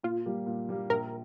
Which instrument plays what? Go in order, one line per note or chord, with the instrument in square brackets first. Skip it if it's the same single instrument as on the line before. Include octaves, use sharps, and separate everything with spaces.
[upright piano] A#2 [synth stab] F4
[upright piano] G3 A#3 G4
A#2
G3 A#3 G4
[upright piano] A#1 [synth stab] A#4